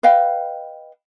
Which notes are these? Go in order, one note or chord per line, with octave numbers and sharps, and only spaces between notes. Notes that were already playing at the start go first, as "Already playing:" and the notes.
B4 D#5 F5 G5